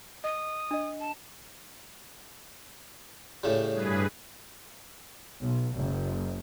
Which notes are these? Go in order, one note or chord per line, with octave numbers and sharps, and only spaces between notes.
D#5 D#6
D4 D#5
A5
A2 C#3 G3
G2 G#4 B4
B1
F#1